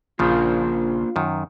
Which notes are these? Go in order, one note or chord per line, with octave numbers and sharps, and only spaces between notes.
A#1 C#3 F3 A#3 D4 F4 C5
F#2 D#3